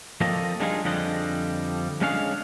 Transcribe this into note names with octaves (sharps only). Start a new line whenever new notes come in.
F3 A#3 C4 A4 D5 D#5
G3 G#3 D4 D#4 F4 G#4
F2 D3 F3 G3 D4 D#5
G#3 C#4 D4 G#4 C#5 F5